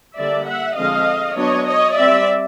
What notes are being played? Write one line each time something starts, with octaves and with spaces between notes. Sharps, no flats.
D3 G3 A#3 D5 E5
E5 F#5
D3 F3 G#3 C4 D#5 F5
F#3 B3 D4 C#5 D#5
C#5 D#5
G3 C4 D5 E5